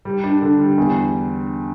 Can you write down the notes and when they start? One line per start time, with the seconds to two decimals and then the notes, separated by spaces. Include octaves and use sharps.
0.05 G3
0.24 D4
0.42 D3
0.60 G3
0.78 E2